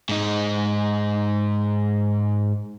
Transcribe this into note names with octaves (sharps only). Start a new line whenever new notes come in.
G#2 D#4